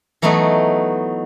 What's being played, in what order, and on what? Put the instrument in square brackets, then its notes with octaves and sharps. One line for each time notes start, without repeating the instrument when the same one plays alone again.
[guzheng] E3 F#3 A3 B3 D#4